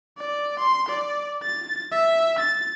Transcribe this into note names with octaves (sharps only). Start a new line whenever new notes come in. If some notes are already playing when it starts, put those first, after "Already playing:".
D5
C6
D5
A6
E5
A6